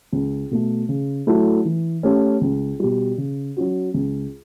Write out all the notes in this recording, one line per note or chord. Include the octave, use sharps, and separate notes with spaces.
C#2
B2 A3
C#3
F#3 A3 E4 A4
E3
A3 C#4 G4
C#2
B2 G3
C#3
F#3 C#4 F#4
C#2